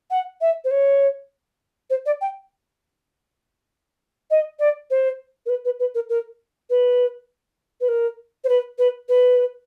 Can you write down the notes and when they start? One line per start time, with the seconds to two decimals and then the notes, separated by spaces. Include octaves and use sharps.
0.11 F#5
0.41 E5
0.64 C5
0.71 C#5
1.90 C5
2.06 D5
2.21 G5
4.31 D#5
4.59 D5
4.90 C5
5.46 A#4
5.49 B4
5.65 B4
5.80 B4
5.95 A#4
6.10 A#4
6.70 B4
7.81 B4
7.88 A#4
8.44 C5
8.49 B4
8.78 B4
9.09 B4